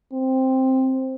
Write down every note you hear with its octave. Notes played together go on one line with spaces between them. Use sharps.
C4